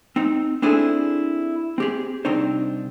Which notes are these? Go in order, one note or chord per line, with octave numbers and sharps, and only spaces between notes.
C4 D#4
C4 D4 E4 G#4 A4 C5
C4 G4 G#4
C2 C4 D4 D#4 C5